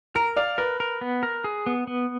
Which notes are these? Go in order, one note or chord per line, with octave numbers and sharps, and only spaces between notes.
A#4 A#5
D5 F5
A#4 B4
A#4
B3
A#4
G#4
B3
B3